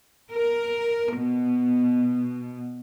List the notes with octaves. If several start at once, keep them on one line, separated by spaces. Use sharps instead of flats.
A#4
B2